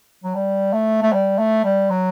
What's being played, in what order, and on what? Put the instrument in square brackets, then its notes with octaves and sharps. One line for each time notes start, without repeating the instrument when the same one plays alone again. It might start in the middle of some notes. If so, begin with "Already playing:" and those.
[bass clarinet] F#3
G3
A3
A3
G3
A3
G3
F#3